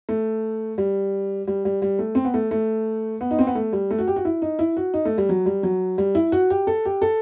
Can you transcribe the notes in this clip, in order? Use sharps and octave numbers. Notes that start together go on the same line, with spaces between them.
A3
G3
G3
G3
G3
A3
C4
B3
A3
A3
B3
D#4
C4
B3
A3
G3
A3
F#4
G4
F#4
E4
D#4
E4
F#4
D#4
A3
G3
F#3
G3
F#3
G3
E4
F#4
G4
A4
G4
A4